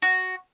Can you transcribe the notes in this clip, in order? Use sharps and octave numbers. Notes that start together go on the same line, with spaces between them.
F#4